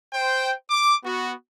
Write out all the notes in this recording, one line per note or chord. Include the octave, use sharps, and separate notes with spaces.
C5 G5
D6
B3 F#4